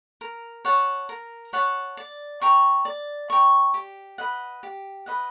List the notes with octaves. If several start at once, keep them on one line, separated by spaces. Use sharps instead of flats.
A#4
C#5 F#5 A5
A#4
C#5 F#5 A5
D5
G5 A#5 C#6
D5
G5 A#5 C#6
G4
B4 D#5 F#5
G4
B4 D#5 F#5